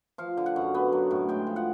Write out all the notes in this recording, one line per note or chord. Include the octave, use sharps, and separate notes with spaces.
F3 F5
D3
F#5
F#2
B3
F#3
A2
G#3 G5
F3
F#5